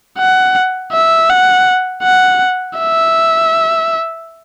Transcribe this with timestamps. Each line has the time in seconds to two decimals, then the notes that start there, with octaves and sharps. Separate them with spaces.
0.18 F#5
0.92 E5
1.30 F#5
2.03 F#5
2.78 E5